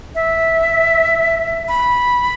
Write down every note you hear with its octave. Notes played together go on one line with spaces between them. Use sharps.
E5
B5